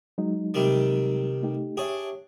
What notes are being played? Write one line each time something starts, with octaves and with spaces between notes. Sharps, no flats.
F#3 G#3 D#4
C3 D#3 G3
A3 D#4 G4
D4 G4 G#4 C#5 E5